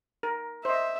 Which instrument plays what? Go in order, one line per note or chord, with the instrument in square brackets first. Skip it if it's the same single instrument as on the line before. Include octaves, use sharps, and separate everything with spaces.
[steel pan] A#4
[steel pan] C5 D#5 [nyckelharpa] E5